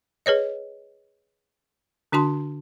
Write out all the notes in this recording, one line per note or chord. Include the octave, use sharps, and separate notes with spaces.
G#4 B4 C#5 D#5
D3 D4 F#4 A5 C6